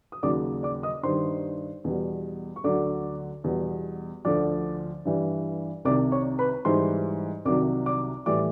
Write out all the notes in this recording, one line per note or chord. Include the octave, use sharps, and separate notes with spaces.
D#6
D#2 C#3 F#3 D5 D6
D5 D6
D#5 D#6
G2 D#3 G3 C5 C6
E2 B2 G3
C#6
D2 D3 F#3 D5 D6
E2 B2 G3
D2 D3 F3 D5 D6
G2 E3 G3
C2 C3 D#3 D5 D6
C#5 C#6
B4 B5
G#2 E3 G3 C5 C6
C2 C3 D#3 F#3 D5 D6
D5 D6
A2 E3 G3 D5 D6